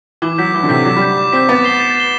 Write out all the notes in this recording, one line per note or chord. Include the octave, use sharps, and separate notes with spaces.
E3 D6
F#3 G6 B6
E3 D6
D3
C3 G6 B6
F#3 D6
G3
G6 B6
D6
C4 G6 B6
B3 A6
C7 E7 G7
A6
C7 E7 G7